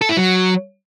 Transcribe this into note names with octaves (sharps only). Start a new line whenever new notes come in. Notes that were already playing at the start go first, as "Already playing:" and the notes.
A4
E4
F#3